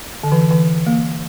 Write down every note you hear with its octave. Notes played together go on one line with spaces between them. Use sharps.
D3
E3
E3
A#3